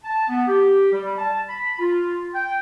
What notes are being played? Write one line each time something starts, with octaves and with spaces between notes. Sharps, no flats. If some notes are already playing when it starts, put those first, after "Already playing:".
A5
B3
G4
G3
A5
B5
F4
G5